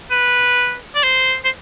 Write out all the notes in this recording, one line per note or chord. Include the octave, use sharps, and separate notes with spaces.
B4
D5
C5
C5